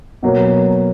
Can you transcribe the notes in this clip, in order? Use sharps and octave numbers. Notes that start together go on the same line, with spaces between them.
B2 F#3 A#3